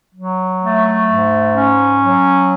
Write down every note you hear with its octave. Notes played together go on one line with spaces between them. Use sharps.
F#3
A3
G#2
C#4
F#3